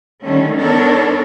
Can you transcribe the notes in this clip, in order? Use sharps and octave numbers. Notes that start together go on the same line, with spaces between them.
D3 D#3 G3 A3 C#4
B3 D4 D#4 A4 A#4 C#5